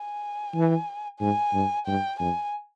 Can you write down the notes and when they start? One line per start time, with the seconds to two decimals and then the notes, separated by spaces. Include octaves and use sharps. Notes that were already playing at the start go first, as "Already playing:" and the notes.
Already playing: G#5
0.55 E3
1.20 G#2 G#5
1.53 G2
1.86 G2 G5
2.19 F2 G#5